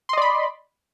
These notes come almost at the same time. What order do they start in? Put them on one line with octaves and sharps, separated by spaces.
C6 D#5 D5 B5